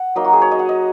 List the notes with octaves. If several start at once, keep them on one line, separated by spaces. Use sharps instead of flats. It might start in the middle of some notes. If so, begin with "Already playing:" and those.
Already playing: F#5
F#3 A#3 D#4 D#5
F#4
G#4
C#5
D#5
F#5
D#5